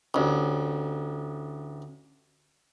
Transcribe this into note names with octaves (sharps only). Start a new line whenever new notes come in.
A1 D2